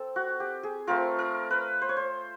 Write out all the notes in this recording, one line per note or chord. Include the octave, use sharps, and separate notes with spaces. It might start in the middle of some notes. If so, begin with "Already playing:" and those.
Already playing: C4 A4
F#4
G4
G#4
A3 C4 F4 A#4
A#4
B4
C5
C#5
C5